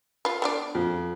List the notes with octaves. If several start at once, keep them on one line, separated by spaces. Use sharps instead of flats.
F4 B4
B3 D4 D5
F2